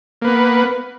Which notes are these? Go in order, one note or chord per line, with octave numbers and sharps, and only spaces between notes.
A#3 B3 B4